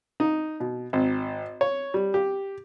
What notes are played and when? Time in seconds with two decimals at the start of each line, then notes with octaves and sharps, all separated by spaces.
0.20 D#4
0.60 B2
0.93 G#1
1.61 C#5
1.94 G3
2.14 G4